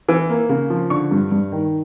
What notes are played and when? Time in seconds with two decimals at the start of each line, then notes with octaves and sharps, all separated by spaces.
0.09 E3
0.29 A#3
0.49 C#3
0.70 F3
0.90 D3 C#6
1.11 G2
1.31 G2
1.52 D#3